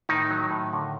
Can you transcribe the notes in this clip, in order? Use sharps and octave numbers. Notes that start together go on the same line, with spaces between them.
A2 D#3 D#4
F#3
A2
D3